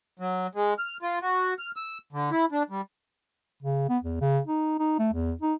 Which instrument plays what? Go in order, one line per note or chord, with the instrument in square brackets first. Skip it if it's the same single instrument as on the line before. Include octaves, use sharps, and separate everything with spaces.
[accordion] F#3
G#3
F6
F4
F#4
F6
E6
D3
E4
D4
G3
[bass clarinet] C#3
B3
E2
C#3
D#4
D#4
A3
E2
D#4